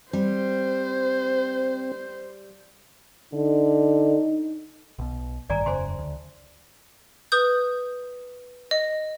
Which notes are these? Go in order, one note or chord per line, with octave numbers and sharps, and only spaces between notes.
G3 C4 C5
D3 D#4
B1 B2
A1 G2 D#3 D5 G#5 A#5
E1 F#2 C#3 C5 G#5 C6
D2
B4 D#6 G6
D#5